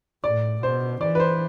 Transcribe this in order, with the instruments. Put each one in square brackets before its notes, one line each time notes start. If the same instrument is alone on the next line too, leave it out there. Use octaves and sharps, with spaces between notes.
[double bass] A2 [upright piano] D5
[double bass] B2 [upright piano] C5
[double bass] E3 [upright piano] D5
[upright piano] B4
C5